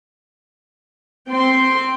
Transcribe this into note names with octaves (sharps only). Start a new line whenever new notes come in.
C4 G5 C6